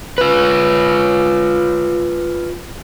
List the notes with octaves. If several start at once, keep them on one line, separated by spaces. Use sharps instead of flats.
F4 B4